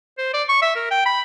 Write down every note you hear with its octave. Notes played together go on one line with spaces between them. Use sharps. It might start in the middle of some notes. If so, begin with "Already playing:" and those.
C5
D5
C#6
E5
A#4
G5
B5